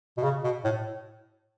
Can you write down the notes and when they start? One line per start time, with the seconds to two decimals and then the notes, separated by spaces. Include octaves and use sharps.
0.17 B2
0.23 C#3
0.44 B2
0.64 A2